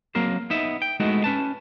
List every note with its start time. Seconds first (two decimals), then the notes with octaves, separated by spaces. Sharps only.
0.15 F#3 A#3 C4 A#4 C5
0.50 B3 D#4 E5
0.82 G5
1.00 G#3 A3 B3 D#4 E4 F#4
1.24 C#4 B4 A5